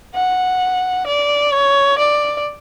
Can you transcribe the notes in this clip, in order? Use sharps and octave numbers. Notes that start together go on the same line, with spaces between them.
F#5
D5
C#5
D5